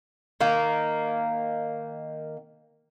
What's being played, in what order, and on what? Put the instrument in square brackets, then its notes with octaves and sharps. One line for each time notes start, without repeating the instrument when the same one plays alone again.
[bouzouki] D#3 A#3